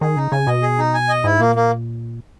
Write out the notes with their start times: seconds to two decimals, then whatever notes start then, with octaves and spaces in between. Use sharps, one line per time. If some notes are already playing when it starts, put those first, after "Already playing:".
0.01 D#3 G#4
0.16 C#3 D#4
0.32 C#3 G#5
0.47 B2 D#5
0.63 G#4
0.79 D#4
0.94 G#5
1.09 D#5
1.24 G#2 E4
1.39 A#2 A#3
1.56 A#3